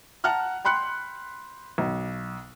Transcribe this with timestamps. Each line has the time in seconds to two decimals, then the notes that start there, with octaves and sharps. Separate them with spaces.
0.24 F#5 A5 A#5 F6 F#6
0.65 G5 B5 C6 F#6 C#7
1.78 B1